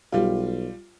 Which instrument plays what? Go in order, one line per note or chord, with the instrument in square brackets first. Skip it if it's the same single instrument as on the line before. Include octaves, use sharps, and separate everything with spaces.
[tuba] B1 [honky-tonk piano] G3 F4